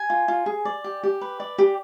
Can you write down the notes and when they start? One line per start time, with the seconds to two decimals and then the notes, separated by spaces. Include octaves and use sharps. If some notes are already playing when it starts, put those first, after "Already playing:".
Already playing: G#5
0.10 F4
0.28 F4
0.46 G#4
0.65 D5
0.84 G4
1.03 G4
1.21 B4
1.40 D5
1.58 G4